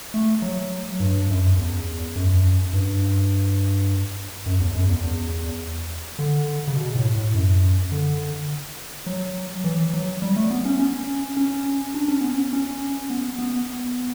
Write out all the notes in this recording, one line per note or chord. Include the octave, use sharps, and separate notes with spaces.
A3
F#3
G2
F#2
E2
F#2
G2
F#2
E2
F#2
E2
E2
D3
C#3
B2
A2
A2
F#2
D3
F#3
E3
F#3
G3
A3
B3
C#4
C#4
C#4
D4
C#4
B3
C#4
C#4
B3
B3